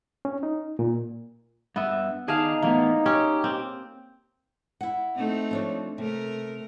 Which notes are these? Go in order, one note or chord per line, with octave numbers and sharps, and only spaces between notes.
C#4
D#4
A#2
G2 B3 E5
D#3 D#4 G#4 D5 F5 A5
E2 A2 A#3 B3
C#4 G4
C4
E4 F#5
A3 C4 D#4
F3 D4 C#5
C3 A3 A#4